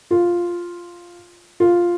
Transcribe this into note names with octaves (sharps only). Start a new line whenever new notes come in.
F4
F4